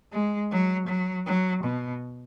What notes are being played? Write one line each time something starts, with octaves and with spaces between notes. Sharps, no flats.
G#3
F#3
F#3
F#3
B2